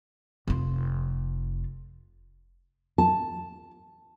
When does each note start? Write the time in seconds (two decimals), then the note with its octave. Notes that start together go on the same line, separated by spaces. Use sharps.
0.48 F1 F4
2.98 A5